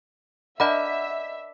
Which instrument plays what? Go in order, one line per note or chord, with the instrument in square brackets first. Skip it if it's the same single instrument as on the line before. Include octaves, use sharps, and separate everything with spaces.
[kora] D4 A#4 [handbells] D#5 F#5 B5 [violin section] E5